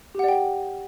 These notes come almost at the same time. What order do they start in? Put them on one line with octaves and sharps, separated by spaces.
G4 F#5 D5 G5